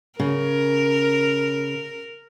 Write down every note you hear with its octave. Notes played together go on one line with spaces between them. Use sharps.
C#3 A#4